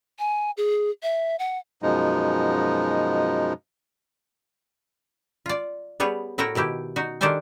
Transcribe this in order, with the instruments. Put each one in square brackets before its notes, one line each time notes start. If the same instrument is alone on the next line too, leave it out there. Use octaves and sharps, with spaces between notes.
[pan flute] G#5
G#4
E5
F#5
[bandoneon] F#2 B2 F3 G#3 D#4
[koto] F4 D5
G3 B3 G#4 C#5
A2 E4 F#4 A#4 G5
B2 D#3 E4 G4
D#4 F#4
D#3 D4 G4 A4 C5 G#5